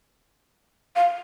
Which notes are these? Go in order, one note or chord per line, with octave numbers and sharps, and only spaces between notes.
F5